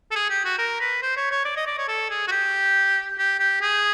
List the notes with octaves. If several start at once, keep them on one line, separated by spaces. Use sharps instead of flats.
A4
G#4
G4
F#4
A#4
B4
C5
C#5
C#5
D5
D#5
D5
C#5
A4
G#4
F#4
G4
G4
G4
G#4